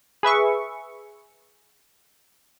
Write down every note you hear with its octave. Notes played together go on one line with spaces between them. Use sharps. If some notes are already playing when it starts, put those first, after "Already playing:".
G#4 B4 E5 C#6